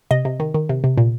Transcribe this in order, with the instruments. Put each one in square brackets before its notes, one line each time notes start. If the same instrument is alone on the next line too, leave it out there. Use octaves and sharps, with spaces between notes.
[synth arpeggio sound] C3 D#5
C3
D#3
D#3
C3
C3
A#2